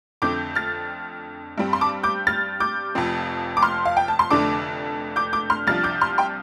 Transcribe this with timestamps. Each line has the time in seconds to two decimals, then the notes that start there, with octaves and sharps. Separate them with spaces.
0.22 F2 D3 A3 C4 D6 G6
0.55 F6 A6
1.58 G2 G3 C4
1.73 C6
1.81 A5 D6
2.03 D6 G6
2.27 F6 A6
2.60 D6 G6
2.95 F1 F2 F3 C4
3.57 D6
3.62 C6 F6
3.85 F5
3.97 G5
4.08 A5
4.19 C6
4.30 F1 F2 D3 A3 D4 A5 D6
5.16 D6 G6
5.33 D6 G6
5.50 C6 F6
5.67 C2 C3 F3 D4 F6 A6
5.84 D6 G6
6.01 C6 F6
6.18 G5 C6